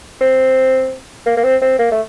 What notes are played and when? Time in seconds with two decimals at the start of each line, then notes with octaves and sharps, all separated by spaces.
0.21 C4
1.26 A#3
1.37 A#3
1.44 C4
1.62 C4
1.79 A#3
1.92 A3